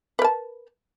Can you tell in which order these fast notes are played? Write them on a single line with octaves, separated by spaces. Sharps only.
B4 A#4 A5